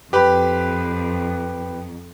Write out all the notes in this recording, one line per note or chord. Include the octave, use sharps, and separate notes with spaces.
F2 G4 B4